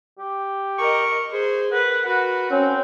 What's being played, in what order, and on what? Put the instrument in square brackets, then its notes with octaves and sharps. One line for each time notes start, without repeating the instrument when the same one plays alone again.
[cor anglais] G4
[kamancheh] A#4 D#5 [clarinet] C#6
[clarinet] G#4 [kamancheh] C5
[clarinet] A#4 [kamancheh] B4 [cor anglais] F#5
[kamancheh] F#4 [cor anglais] B4
[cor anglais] C4 [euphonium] C#4